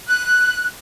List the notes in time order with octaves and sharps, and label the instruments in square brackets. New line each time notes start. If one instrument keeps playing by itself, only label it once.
[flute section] F#6